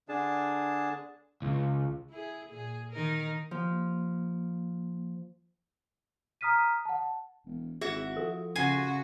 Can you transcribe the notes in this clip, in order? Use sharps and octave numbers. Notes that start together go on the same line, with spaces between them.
D3 D4 G#4 A5
C#2
E4 G#4
A#2 G#4
D#3 D#4 A#4
F3 A#3
A#5 D#6 F6 B6 D#7
F#5 A5
E1
G#1 E4 F#4 G#4 E5
F3 A4
C#3 F#4 G#5 C6